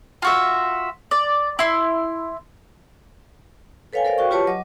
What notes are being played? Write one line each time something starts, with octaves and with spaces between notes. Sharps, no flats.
F4 F#4 E5
D5
E4 C6
A4 B4 C#5 F5 G5 G#5
A4 A#4 C5 D5 F5
F#4 G5 C#6
F4 G4 B4 C#5 A5 C#6
F#3 D#5 D6